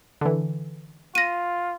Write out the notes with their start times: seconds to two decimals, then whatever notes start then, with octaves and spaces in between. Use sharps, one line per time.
0.21 D3 E3
1.15 F4 A#6 D#7